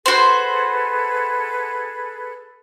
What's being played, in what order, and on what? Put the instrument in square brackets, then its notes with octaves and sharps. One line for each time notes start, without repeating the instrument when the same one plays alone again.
[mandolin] F#4 C5 [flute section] G#4 A4 B4